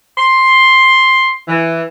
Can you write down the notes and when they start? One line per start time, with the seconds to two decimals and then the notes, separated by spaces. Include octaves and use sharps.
0.18 C6
1.49 E3